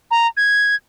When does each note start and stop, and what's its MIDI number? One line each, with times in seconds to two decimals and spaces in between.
0.11 0.27 82
0.37 0.75 92